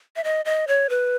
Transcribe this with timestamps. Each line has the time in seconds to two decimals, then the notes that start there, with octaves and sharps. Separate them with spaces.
0.16 E5
0.24 D#5
0.45 D#5
0.68 C#5
0.90 B4